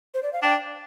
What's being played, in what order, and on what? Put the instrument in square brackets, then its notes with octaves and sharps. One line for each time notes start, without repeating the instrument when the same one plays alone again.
[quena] C5
D5
F5
[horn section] D4 [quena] G5